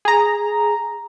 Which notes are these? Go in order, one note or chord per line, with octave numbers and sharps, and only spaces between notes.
G#4 A#5